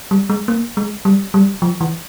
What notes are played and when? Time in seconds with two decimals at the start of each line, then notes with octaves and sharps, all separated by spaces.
0.11 G3
0.30 G#3
0.48 A#3
0.77 G#3
1.05 G3
1.34 G3
1.62 F3
1.81 E3